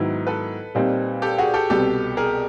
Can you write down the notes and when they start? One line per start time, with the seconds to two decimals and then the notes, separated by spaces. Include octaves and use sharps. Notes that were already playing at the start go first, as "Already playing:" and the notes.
Already playing: G#2 D#3 F#3 B3 E4
0.27 A4 B4
0.75 A#2 G3 C4 D#4
1.22 G4 A4
1.38 F#4 G#4
1.54 G4 A4
1.70 C2 B2 G3 B3 G4 A4
2.17 G#4 A#4